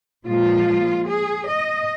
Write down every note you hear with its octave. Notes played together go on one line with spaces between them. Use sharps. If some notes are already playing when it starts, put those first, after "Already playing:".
A#2 F3 G#3 F4
G#4
D#5